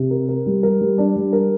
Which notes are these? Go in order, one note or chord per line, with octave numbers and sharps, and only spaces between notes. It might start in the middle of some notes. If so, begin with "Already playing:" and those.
Already playing: C3
A#4
A#4
G3
A#4
G3
D4
G3
A#4